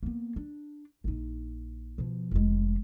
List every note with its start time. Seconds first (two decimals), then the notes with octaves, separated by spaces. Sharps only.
0.03 A#3 B3
0.36 D4
1.04 A#1 D#4
1.98 B2 F3
2.31 F1 G#3